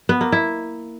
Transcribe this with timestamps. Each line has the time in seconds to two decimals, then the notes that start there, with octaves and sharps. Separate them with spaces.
0.09 B3
0.21 A#3
0.32 E4